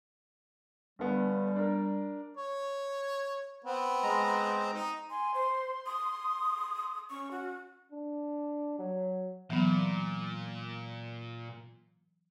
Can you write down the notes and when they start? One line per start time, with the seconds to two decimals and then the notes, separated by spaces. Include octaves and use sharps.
0.99 G1 G3 B3
1.56 D4 A#4
2.37 C#5
3.64 B3 C4
4.03 G#3 A#5
4.73 D#4
5.10 G#5 C6
5.34 C5
5.86 D#6
7.10 C#4 C#6
7.31 F#4
7.92 D4
8.79 F#3
9.50 A#2 E3 F#3 B3